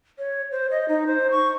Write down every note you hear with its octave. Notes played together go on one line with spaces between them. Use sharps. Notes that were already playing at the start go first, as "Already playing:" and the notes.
C#5
C5
D#5
D#4
C5
C#6